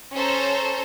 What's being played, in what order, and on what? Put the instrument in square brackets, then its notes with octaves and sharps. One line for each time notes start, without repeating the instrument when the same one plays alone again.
[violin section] C#4 A4 C5 C#5 A#5